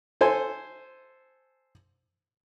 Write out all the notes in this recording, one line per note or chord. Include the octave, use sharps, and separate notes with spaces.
A4 C5 G#5